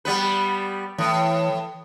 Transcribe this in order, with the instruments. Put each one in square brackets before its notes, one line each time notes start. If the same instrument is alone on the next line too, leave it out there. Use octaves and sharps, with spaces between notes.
[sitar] G3 B3 B4
[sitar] A2 [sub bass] E3